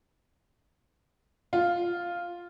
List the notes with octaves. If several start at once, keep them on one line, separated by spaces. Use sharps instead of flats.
F4